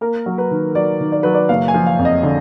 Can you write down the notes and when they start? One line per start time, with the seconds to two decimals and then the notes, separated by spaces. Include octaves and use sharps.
0.01 A#3 A#4
0.26 F#3
0.38 B4
0.51 D#3
0.75 F#3 D5
1.00 D#3
1.12 D5
1.23 F#3 B4
1.34 D5
1.49 F#1 F5
1.68 G#5
1.74 F3
1.86 F5
1.99 F2
2.05 D#5
2.23 D3